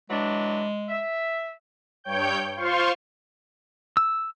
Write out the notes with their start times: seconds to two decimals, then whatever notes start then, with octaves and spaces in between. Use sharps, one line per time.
0.10 E3 F#3 G#3 D4
0.89 E5
2.04 G2 C#5 G5 G6
2.57 F4 C5 F5 C6 C#6
3.97 E6